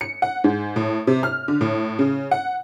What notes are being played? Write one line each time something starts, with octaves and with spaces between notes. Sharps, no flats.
C#7
F#5
G#2
A2
C3
F6
D3
A2
C#3
F#5